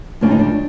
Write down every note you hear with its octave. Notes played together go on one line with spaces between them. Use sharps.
D2 C#3 F3 G#3 D4
D#4
D4